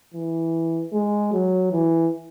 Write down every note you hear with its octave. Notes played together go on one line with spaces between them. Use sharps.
E3
G#3
F#3
E3